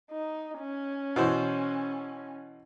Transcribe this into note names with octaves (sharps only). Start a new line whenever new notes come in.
D#4
C#4
B2 E3 C5